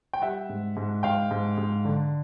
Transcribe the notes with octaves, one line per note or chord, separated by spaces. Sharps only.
G5
G3 E5 F#5
G#2
G#2
G#2 F5 G5
G#2
G#2
D3